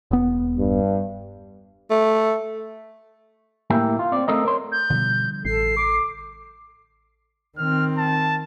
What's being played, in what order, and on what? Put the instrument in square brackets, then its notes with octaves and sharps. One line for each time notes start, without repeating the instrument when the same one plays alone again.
[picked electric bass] E1 B3
[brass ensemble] G2
[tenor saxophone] A3
[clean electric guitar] A2 A#3 E4 G4
F4
C4 D5
A3 C4 A4 A#4 D#5
A#4 C#5 C6
[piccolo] G6
[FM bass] B2 [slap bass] D3 F3 G3
[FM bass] A1 [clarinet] A4 [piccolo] C7
[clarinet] D6
[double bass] D#3 C4 [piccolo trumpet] F6
[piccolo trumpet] A5